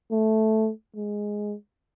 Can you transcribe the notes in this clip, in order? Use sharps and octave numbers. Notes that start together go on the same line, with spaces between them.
A3
G#3